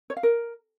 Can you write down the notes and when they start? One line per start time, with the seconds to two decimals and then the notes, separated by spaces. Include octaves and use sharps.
0.10 C#5
0.17 F5
0.23 A#4